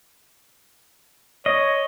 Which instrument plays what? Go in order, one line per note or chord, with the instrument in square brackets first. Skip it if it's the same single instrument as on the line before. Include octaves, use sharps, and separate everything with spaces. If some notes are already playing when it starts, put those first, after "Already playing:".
[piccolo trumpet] C#5 [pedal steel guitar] D#5